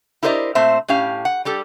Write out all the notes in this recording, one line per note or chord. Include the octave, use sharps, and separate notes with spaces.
E4 G4 A#4 C5 D5 D#5
A#2 A3 C4 C5 E5
A2 C#4 G4 F5
F#5
G3 G4 A4